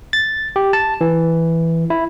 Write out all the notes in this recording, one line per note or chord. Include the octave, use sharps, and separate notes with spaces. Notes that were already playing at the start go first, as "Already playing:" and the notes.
A6
G4
A5
E3
E4